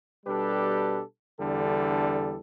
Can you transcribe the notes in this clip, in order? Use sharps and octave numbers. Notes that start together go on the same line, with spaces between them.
B2 G3 D4 G4 A4 B4
E2 D3 G3 D4 A4